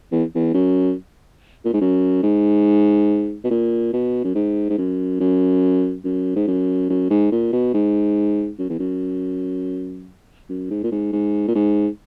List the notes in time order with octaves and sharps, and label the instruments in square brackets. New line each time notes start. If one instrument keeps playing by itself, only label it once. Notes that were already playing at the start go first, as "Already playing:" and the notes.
[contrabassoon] E2
E2
F#2
A#2
G#2
F#2
G#2
B2
A#2
B2
F#2
G#2
G#2
F#2
F#2
F#2
G#2
F#2
F#2
G#2
A#2
B2
G#2
F#2
E2
F#2
F#2
G#2
A#2
G#2
G#2
A#2
G#2